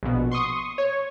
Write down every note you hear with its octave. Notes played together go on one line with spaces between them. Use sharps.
A#1 B2
C6 C#6 D#6
C#5